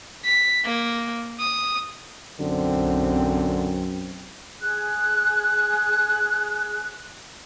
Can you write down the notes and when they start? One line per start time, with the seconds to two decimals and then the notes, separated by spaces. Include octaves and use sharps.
0.25 B6
0.65 A#3
1.40 D#6
2.40 B1 F#2 D3 C4
4.60 G#4 F#6